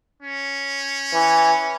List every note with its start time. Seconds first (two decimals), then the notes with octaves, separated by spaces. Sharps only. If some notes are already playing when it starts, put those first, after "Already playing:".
0.22 C#4
1.14 E3